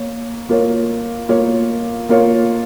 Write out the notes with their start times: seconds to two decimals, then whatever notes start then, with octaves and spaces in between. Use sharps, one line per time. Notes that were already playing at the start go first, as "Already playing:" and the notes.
Already playing: A#3 C#5
0.49 A#3 F4 A#4 C#5
1.29 A#3 F4 A#4 C#5
2.09 A#3 F4 A#4 C#5